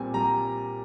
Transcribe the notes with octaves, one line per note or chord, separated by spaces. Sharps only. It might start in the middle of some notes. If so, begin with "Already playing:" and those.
Already playing: A#2 G3 C4 G#5
G3 A#5